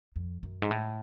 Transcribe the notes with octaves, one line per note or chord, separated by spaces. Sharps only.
F2
F#2
G#2
A2